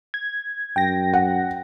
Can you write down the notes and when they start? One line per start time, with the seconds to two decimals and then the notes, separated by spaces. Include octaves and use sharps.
0.14 G#6
0.76 F#2 G5 A#6
1.13 F#5